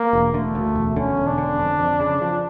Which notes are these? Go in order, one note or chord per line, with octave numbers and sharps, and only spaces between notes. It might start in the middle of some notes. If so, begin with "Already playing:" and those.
Already playing: A#3
E1
D3 A3
D2
E1
D3 C#4
E1
D4
D3
F2
F2
C#3
F3